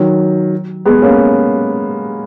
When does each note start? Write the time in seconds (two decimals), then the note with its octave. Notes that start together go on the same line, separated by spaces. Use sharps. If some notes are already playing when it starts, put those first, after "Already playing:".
Already playing: D#3 F#3
0.85 G#3 B3
1.02 A#3 C#4